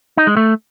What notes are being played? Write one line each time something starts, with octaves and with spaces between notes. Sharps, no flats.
D#4
G#3
A3